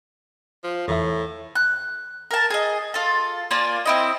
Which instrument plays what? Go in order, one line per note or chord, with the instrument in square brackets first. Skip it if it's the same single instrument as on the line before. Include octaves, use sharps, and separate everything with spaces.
[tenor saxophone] F3
[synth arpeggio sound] E2 E3 E5 [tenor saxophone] A2
[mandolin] F#6
A#4 A5
G#4 D#5
F4 A4
A#3 F4 D5 G#5
C4 E4 D#5